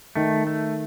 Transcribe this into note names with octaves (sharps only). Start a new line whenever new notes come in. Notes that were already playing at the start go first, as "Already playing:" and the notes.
D#3 A3
A3